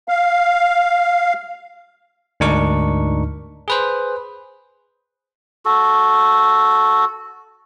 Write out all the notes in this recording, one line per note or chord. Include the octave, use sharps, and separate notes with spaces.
F5
D2 G#2 D4 D#4 A#4 C#6
G#4 B4 C5
F#4 A4